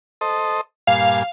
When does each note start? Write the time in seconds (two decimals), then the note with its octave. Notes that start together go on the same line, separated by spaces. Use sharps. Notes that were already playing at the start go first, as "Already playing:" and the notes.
0.21 A4 C5 D#5
0.87 G2 A#2 F5 G#5